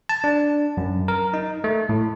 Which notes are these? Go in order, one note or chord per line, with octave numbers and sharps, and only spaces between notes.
A5
D4
F#2
A#4
D#4
A3
A2